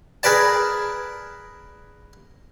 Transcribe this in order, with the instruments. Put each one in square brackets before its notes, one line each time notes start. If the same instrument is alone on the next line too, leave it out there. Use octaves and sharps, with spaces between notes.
[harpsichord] G#4 A#4 B4 D5 A5